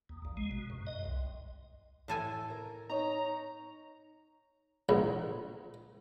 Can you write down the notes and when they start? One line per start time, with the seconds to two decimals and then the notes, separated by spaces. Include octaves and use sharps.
0.09 D#2
0.25 A#1
0.37 G#3
0.51 B2
0.70 F#2
0.87 D#5
1.05 C2
2.08 A2 A4 G#5
2.50 A#4
2.89 D#4 C#5 A#5
4.89 A#1